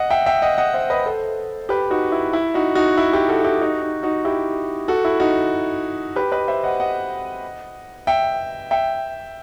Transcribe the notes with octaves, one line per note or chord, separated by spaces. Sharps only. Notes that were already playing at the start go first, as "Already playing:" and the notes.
Already playing: D#5 F#5
E5 G5
E5 G5
D#5 F#5
D#5 F#5
C5 E5
B4 D#5
A4 C5
G4 B4
D#4 F#4
E4
E4
D#4 F#4
D#4 F#4
E4
E4 G4
F#4 A4
E4 G4
D#4 F#4
D#4
D#4 F#4
E4 G4
F#4 A4
E4
D#4 F#4
G4 B4
B4 D#5
C5 E5
D#5 F#5
D#5 F#5
E5 G5
E5 G5